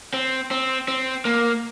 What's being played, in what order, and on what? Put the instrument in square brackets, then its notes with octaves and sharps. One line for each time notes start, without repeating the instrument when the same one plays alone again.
[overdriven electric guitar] C4
C4
C4
A#3